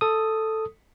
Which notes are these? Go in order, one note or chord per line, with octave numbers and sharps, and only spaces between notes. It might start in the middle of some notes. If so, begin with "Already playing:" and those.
A4 D#6